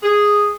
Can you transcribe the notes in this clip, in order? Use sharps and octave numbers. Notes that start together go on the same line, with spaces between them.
G#4